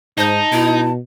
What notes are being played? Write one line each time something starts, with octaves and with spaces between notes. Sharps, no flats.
G#2 D#4 C5 A5
B2 E4